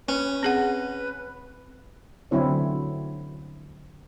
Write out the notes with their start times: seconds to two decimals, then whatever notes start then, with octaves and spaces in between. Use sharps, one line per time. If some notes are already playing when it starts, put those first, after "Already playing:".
0.09 C#4 B4
0.43 C4 G#4 F#5
2.31 D3 F#3 C4 E4 C#5